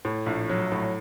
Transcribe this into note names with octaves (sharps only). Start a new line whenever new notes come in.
A2
A#1
F#3
A2